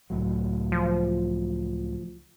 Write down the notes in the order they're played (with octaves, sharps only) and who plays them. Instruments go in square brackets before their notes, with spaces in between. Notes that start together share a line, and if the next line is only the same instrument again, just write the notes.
[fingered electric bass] C#2 A2 F#3
[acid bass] F3